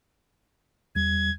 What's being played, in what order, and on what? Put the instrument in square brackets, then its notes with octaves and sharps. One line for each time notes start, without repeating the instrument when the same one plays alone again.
[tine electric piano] E2 G3 [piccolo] G#6